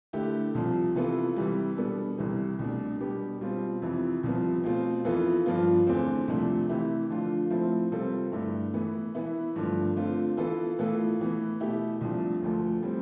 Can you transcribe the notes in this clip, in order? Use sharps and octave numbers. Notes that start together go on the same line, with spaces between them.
D3 A3 E4 G4
C2 C3 F3
C3 E3 B3 F4 A4
C3 E3 G3
B2 G3 B3 D4 A4
C2 C3 E3 G3
C2 B2 A3 D4
B2 G3 B3 D4 G4
B2 G3 C4 F4
F2 C3 E3
C2 C3 F3 B3
B2 A3 C4 F4
F2 E3 B3 F4 A4
G2 F3 B3 F4
E2 D3 A3 C4
C2 C3 F3 A3 D4
C3 E3 A3 E4 G4
D3 F3 A3 D4 F4
A2 F3 A3 C4 E4
C3 G3 C4 F4 A4
G2 D3 A3 E4
A2 E3 B3
E3 B3 E4
G2 D3 F3 A3
D3 A3 C4 F4
E3 B3 F4 A4
A2 E3 B3 F4 A4
A2 E3 B3
B2 A3 E4 G4
C2 C3 F3 A3 D4
D2 D3 F3 A3
A2 G3 C4